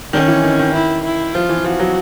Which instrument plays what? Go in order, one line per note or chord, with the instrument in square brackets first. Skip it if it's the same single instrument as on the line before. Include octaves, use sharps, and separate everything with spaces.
[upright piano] D#3 [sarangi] C#4
[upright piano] E3
D#3
D#3
[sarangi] E4
E4
[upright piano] F3 [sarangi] F4
[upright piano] E3
[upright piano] F3 [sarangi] F#4
[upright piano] F#3